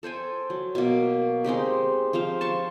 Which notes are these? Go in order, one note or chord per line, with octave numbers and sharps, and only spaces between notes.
A4 C5 G5 G#5
F#3
B2 A#3
G#3 C4 D#4 G4
F3 C4 C5 F5
A5 C6 C#6